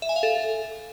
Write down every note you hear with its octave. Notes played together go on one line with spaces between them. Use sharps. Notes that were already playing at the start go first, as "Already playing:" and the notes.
E5
G#5
F5
A4